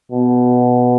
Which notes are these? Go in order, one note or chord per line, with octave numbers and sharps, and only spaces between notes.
B2